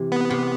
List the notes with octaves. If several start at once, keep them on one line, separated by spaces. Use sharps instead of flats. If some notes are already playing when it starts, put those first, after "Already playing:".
Already playing: C3 E3
B3
C3